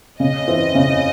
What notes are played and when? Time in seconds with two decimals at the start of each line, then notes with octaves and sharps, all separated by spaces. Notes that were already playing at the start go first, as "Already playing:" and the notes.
0.20 C#3 D#5
0.47 E3 C4 E4
0.75 C#3